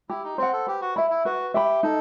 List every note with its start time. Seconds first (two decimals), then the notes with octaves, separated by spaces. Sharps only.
0.10 E4 G4
0.24 D#4
0.38 C4 C5 F#5
0.53 A4
0.67 G4 B4
0.81 F#4
0.96 E4 E5 B5
1.10 E4
1.25 F#4 B4
1.54 G4 E5 B5
1.83 D#4 A4